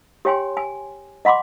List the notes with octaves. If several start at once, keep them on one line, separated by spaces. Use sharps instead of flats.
G4 C#5 G5 G#5 C6
G#5
D#5 F#5 B5 C6 D6